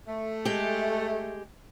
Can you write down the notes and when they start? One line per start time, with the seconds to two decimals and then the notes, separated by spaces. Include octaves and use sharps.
0.08 A3
0.45 G#3 G4